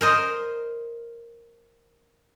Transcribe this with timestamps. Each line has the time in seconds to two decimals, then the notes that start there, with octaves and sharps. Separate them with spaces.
0.01 A#4 C5 D#5